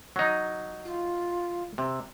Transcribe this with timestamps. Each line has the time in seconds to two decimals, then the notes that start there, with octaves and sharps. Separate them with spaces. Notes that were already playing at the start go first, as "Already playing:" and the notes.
0.16 F#3 D#4
0.85 F4
1.78 C3